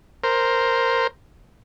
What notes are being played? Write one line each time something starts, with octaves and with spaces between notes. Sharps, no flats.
A#4 C5